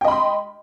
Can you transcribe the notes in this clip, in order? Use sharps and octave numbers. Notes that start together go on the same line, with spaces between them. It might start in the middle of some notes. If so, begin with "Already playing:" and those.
D#5 G5 B5 C6